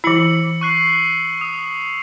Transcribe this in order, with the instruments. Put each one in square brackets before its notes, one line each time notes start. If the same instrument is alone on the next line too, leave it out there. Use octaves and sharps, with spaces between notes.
[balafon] E3 E4 [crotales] E6 C#7 F#7
[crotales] C#6 F#6 C7
D#6